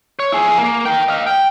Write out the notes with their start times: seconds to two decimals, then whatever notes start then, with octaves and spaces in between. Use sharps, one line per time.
0.19 C#5
0.32 E4 G#4
0.58 A#3
0.85 A#4 G5
1.08 D#5 F5
1.27 G5